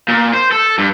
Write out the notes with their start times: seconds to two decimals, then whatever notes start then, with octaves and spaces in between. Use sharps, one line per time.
0.09 A#2
0.34 C5
0.52 A4
0.79 G2